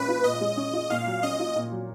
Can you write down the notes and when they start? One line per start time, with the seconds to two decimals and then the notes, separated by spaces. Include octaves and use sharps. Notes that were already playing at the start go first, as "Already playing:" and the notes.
Already playing: A#2 G#3 C#4 B4
0.08 F4
0.24 A#2 D#5
0.41 G#3
0.57 C#4
0.73 F4
0.90 A#2 F5
1.07 F#3
1.23 C#4 D#5
1.40 F4
1.56 A#2
1.72 F#3